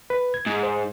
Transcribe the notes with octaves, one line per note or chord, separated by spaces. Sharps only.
B4
G#6
G#2
C5